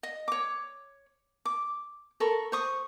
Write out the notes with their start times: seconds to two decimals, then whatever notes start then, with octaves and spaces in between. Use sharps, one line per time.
0.03 D#5
0.28 C#5 D6
1.45 D6
2.20 A4 A#4 B5 C#6
2.52 C5 C#6 D#6